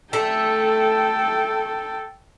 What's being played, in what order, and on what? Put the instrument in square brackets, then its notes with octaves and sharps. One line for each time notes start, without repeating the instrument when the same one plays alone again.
[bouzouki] A3 [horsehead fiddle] A4 G5